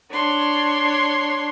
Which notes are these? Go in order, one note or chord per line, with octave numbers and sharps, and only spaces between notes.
D4 C#5 C6